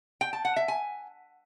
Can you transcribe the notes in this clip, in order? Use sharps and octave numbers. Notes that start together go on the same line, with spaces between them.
G5
A5
F#5
E5
G#5